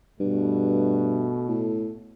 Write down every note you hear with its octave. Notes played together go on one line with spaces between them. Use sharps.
G2 B2 A3
A2